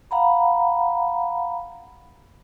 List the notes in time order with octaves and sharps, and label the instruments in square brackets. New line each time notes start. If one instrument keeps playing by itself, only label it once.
[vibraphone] F5 F#5 A#5 B5